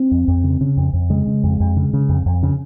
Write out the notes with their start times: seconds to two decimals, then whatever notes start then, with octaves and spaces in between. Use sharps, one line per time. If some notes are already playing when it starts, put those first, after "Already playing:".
Already playing: C4
0.11 F2
0.28 F2
0.44 C#3
0.61 C#3
0.77 F2
0.93 F2
1.10 C#3 G#3
1.27 C#3
1.44 F2
1.60 F2
1.77 C#3
1.93 C#3
2.09 F2
2.26 F2
2.43 C#3